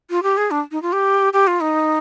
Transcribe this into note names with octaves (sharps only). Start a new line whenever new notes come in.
F4
G4
G#4
D4
D#4
F4
G4
G4
F4
D#4